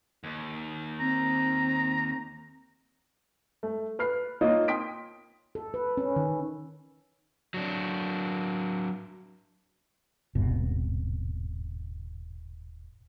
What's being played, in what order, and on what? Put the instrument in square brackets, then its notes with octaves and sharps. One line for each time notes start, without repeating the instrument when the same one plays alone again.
[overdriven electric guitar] D#2
[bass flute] C4 [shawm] A#5
[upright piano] A3
B4 F6 C7
A#3 D#4 F4 C#5 D#5
G5 C6 D#6 B6 D7
[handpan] A4
B4
C#4
D#3
[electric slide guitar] F#3 D4
[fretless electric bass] D#1 G#1 G2 B2